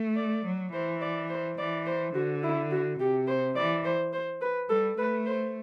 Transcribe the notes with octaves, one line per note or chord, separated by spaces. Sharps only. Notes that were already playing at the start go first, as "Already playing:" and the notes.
Already playing: A3
D5
F#3
E3 C5
D5
C5
E3 D5
C5
D3 F#4
E4
F#4
C3 G4
C5
E3 D5
C5
C5
B4
G3 A4
A3 B4
C5